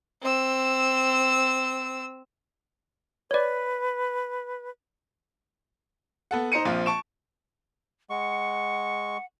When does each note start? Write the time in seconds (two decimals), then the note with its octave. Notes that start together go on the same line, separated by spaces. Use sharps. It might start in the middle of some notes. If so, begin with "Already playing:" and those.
0.22 C4 E6
3.31 B4 C#5 D5
6.31 B3 A4 F#5
6.52 D#4 C5 A#5 C#7 D#7
6.65 A#1 F3 C4 F4
6.86 A5 C#6 D7 E7
8.10 G#3 F#5 C#6